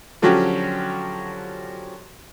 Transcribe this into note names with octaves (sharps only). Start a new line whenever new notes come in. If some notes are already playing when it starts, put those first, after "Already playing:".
D3 F3 F#3 C#4 F#4 G4